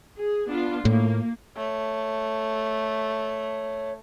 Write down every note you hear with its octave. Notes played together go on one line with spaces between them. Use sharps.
G#4
B3 D4 F4
A2 A#3
A3 C#5